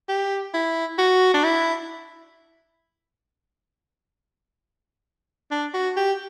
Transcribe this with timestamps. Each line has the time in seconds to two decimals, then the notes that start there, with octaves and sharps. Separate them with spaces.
0.09 G4
0.54 E4
0.98 F#4
1.34 D4
1.44 E4
5.51 D4
5.74 F#4
5.97 G4